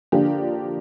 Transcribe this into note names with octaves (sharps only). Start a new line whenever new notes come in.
D3 F3 A#3 D4 F4 G4